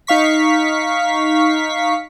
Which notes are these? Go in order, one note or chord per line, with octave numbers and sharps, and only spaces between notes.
D#4 F5 C#6 B6